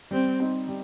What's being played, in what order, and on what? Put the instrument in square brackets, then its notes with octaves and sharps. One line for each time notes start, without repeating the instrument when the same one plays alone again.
[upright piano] G3 [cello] C4
[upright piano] C4 D#4
G3